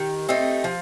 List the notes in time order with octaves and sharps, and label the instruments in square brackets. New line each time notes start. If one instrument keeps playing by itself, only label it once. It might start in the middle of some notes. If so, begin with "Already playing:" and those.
Already playing: [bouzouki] D#3 G4
A3 C4 D#4
F3